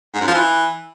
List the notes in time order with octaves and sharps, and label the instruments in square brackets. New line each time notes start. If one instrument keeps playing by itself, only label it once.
[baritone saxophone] G#2
F#2
F3
E3